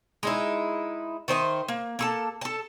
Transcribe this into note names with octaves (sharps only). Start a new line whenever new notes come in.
G#3 D#4 E4
D#3 C5 D#5 E5
A#3
A#3 A4 A5
A4 A5